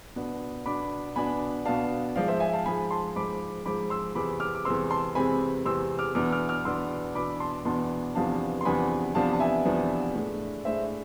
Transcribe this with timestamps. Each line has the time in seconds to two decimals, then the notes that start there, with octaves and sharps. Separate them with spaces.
0.16 B2 B3 D4
0.66 B2 B3 D4 B5 D6
1.16 B2 B3 D4 G#5 B5
1.65 B2 B3 D4 F5 A5
2.16 G#2 F3 G#3 D5 F5
2.28 C5 E5
2.40 E5 G#5
2.53 F5 A5
2.66 G#2 F3 G#3 G#5 B5
2.91 A5 C6
3.16 G#2 F3 G#3 B5 D6
3.65 G#2 F3 G#3 B5 D6
3.90 C6 E6
4.15 E2 C3 G#3 C4 B5 D6
4.40 D6 F6
4.55 D6
4.65 E2 C3 G#3 C4 C6 E6
4.91 A5 C6
5.15 E2 C3 G#3 C4 G#5 B5
5.65 E2 C3 G#3 C4 C6 E6
5.99 D6 F6
6.15 E2 B2 B3 D4 D6 F6
6.32 D6 F6
6.49 D6 F6
6.65 E2 B2 B3 D4 C6 E6
7.15 E2 B2 B3 D4 B5 D6
7.40 A5 C6
7.65 E2 B2 B3 D4 A5 C6
8.15 E2 C3 F3 B3 D4 F5 A5
8.61 C6
8.65 E2 C3 F3 B3 D4 G#5 B5
9.15 E2 C3 F3 B3 D4 F5 A5
9.33 A5
9.40 E5 G#5
9.65 E2 C3 F3 B3 D4
10.15 A2 G#3 D4
10.65 A2 G#3 D4 C5 E5